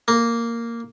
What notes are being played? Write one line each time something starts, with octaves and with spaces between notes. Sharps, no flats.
A#3